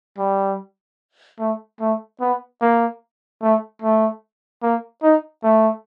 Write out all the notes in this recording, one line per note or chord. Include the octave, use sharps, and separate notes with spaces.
G3
A3
A3
B3
A#3
A3
A3
A#3
D#4
A3